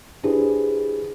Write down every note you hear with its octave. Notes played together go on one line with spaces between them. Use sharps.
D4 E4 G4 G#4 B4 C5